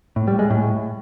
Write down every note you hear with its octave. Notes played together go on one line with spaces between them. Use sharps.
A2
G3
G#3
A2